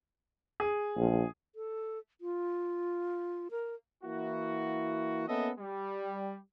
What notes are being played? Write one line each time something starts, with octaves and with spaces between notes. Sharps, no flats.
G#4
A#1
A4
F4
A#4
E3 A#3 E4 F#4
A#3 B3 C#4 A4 D#5 E5
G3